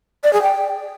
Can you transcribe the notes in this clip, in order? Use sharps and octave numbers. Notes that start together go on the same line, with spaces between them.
D5
G#4
G5